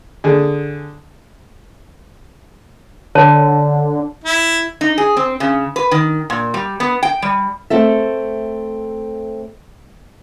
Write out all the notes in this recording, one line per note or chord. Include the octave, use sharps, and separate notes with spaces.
D3 G#4
D3 C#5 A5
E4
D#4
G#4
C4
C#3
B4
D#3
A#2
G3
B3
G5
G3
A3 C4 A4 E5